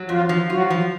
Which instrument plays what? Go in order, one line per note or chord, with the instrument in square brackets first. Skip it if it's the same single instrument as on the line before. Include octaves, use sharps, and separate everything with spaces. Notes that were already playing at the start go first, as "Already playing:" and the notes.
Already playing: [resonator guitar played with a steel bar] F#3
[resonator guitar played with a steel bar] F2 [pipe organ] F3 F4
[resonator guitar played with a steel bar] F3
[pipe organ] F#3 F#4 [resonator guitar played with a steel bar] F4
[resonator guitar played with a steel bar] F3